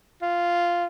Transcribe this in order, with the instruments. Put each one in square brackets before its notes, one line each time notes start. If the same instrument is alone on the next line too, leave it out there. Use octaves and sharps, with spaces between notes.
[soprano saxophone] F4